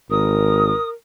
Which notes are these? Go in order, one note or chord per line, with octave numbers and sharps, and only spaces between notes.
G#1 A#4 D#6